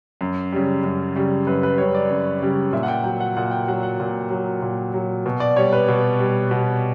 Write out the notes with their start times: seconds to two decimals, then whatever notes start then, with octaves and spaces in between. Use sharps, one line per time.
0.21 F#2
0.52 C#3 G3
0.84 F#2
1.16 C#3 G3
1.47 F#2 B4
1.63 B4
1.78 C#3 G3 C#5
1.95 D5
2.10 F#2
2.42 C#3 G3
2.73 A#2 E5
2.83 F#5
2.88 G5
3.04 F#3 G5
3.21 F#5
3.37 A#2 F#5
3.51 G5
3.68 F#3 F#5
3.83 F#5
4.00 A#2
4.30 F#3
4.62 A#2
4.94 F#3
5.26 B2
5.40 D5
5.56 G3 C#5
5.73 B4
5.88 B2
6.19 G3
6.51 B2